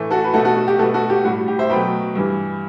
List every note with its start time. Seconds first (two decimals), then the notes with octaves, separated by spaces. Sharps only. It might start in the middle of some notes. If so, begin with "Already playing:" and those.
Already playing: A2 E3 A3
0.11 F#4 A4
0.24 B4
0.33 B2 A3 F#4 A4
0.45 F#4 A4
0.56 F#4
0.68 G4
0.79 B2 A3 F#4 A4
0.94 F#4 A4
1.10 G4
1.25 A2 G3 F#4
1.48 G4
1.59 C5 E5
1.70 B2 F#3 A3 G5 B5
2.15 G2 E3 G3